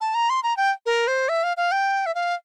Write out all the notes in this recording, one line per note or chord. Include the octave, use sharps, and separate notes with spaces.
A5
A#5
C6
A#5
G5
A#4
C5
E5
F5
F5
G5
E5
F5